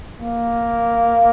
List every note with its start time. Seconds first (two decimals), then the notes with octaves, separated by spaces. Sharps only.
0.20 A#3